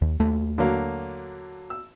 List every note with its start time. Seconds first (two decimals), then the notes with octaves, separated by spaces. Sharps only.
0.02 D#2
0.20 D#2 A3
0.58 D3 F#3 A#3
1.70 E6